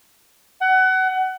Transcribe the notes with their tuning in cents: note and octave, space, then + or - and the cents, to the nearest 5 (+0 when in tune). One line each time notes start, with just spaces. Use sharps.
F#5 +25